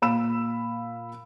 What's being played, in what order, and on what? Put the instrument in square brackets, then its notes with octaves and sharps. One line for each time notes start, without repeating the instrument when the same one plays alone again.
[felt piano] A#2 F5 B5 E6 E7